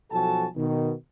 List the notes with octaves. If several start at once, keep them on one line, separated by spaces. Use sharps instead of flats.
B1 F3 F#4 A4 G#5 A5
B2 D#3